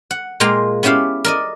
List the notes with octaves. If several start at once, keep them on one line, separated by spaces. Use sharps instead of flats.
F#5
A#2 G#3 A#3 F4 G5 A#5
B3 C#4 E4 G4 F5
A#4 D5 D#5